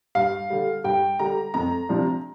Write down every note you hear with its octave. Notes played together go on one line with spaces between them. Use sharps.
G2 F5
D3 G3
G2 G5
D3 G3 A#5
F2 A#5
C3 F3 D4